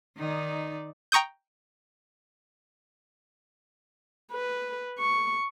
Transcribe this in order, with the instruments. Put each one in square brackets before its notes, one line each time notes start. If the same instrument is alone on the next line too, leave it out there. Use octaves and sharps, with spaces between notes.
[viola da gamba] D#3 D#4 D5
[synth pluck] G5 A#5 C#6 D#6 G6
[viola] B4
C#6